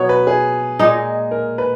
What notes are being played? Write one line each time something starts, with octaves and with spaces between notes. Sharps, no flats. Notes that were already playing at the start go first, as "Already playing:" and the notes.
Already playing: B2 F#3 B3 C#5
B4
G#4
A#2 G#3 D#4
A#4
B4